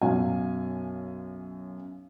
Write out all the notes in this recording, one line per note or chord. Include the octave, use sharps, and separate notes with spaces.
B1 F#2 F5 G#5